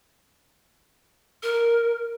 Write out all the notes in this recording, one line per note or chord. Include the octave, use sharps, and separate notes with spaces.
A#4